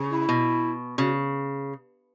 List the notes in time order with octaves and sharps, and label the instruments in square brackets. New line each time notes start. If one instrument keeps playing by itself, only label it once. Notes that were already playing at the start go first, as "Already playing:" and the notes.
Already playing: [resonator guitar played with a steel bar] C#3
[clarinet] E4
[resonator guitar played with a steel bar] B2
[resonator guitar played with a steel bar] C#3 [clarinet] F#4